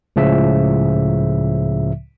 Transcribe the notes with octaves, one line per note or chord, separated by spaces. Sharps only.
C#2 A2 C#3 F3 E5